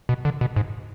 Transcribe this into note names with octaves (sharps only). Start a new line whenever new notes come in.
B2
D3
B2
G#2